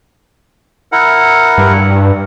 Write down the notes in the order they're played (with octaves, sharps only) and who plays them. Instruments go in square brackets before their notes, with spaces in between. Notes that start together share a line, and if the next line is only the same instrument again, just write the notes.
[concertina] E4 A#4 F#5
[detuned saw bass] G2